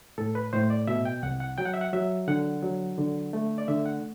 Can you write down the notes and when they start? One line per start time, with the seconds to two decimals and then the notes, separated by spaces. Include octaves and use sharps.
0.18 A2 A4
0.35 B4
0.53 A2 C5
0.70 D5
0.87 B2 E5
1.05 G5
1.23 C2 F#5
1.40 F#5
1.58 F#3 G5
1.65 F#5
1.74 E5
1.81 F#5
1.93 F#3 E5
2.28 D3 F#5
2.63 F#3
2.98 D3
3.33 A3
3.58 D5
3.68 D3 E5
3.86 F#5